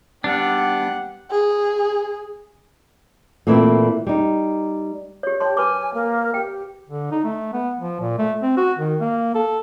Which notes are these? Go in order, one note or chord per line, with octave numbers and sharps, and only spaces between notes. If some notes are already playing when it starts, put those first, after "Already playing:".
G3 B3 D4 G4 F#5
G#4
A#2 E3 A3 C4 E4
G3 D#4
G4 C#5
G4 C#5 A5 C6
B4 G#5 C6 D6
A#3
G4 G5
D3
D#4
A3
B3
F3
A#2
A3
C4
F#4
D#3
A#3
A4